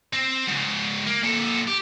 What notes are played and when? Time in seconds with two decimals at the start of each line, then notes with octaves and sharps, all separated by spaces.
0.13 C4
0.48 G#2 C#3
1.07 A#3
1.23 A#2 A4
1.68 G4